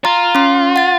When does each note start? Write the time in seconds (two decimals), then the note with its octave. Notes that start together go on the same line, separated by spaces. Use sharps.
0.05 F4 A#5
0.35 C#4 C6
0.76 F#5 A6